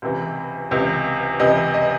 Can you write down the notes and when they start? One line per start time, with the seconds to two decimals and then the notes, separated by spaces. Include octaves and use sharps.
0.02 C#2 C3 E3
0.71 C#2 C3 E3
1.39 C#2 C3 E3 D#5
1.74 D#5